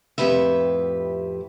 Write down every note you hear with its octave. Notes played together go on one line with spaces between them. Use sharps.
F2 A2 G4 B4 E5